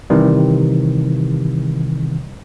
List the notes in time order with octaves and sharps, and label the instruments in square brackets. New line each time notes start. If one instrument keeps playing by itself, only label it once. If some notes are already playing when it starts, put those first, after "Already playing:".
[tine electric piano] C3 D#3 E3 G3